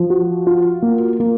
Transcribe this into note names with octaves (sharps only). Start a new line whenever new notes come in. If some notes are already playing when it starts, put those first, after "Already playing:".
Already playing: F3
F#4
F4
A#3
A#3